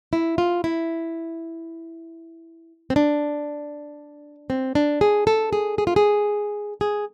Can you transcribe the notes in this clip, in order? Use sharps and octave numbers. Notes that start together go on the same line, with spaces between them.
E4
F4
E4
C4
D4
C4
D4
G#4
A4
G#4
G#4
F4
G#4
G#4